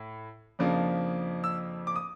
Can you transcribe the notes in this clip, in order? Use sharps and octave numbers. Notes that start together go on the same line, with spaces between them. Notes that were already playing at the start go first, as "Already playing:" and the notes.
Already playing: A2
F2 C#3 F3 A#3 D4
E6
D6
D#6